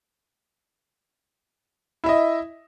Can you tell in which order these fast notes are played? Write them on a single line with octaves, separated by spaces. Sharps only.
E4 E5 D#5